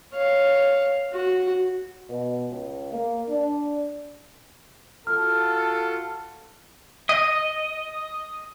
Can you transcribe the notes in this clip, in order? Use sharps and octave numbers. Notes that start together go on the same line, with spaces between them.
C#5 F5
F#4
B2
C#2
A#3
D4
F4 F#4 A4 F6
D#5